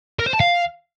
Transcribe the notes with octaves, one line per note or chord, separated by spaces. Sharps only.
A#4
C5
A5
F5